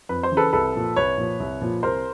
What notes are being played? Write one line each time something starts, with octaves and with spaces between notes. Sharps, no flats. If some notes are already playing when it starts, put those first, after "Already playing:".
F2 B4
C5
C#3 E3
A4 B4
C2 A4 B4
A#2 F3
C2 B4 C#5
A#2 F3
C2
A#2 F3
C2 A#4 C5